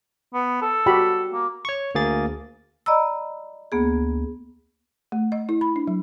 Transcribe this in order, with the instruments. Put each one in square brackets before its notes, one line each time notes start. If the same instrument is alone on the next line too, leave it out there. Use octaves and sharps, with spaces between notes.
[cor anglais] B3
A4
[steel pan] F#4 G4 B5
[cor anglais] A#3
[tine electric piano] C#5 C#6
D2 A#3 G#4 A6
[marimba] D5 D#5 A#5 B5 E6
D2 A#3 B3 G#4
[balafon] A3
D#5
E4
B5
D4
F#3